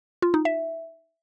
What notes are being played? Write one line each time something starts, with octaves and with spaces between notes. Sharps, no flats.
F4
D#4
E5